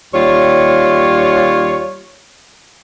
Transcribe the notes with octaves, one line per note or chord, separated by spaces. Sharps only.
D#2 G3 F4 C#5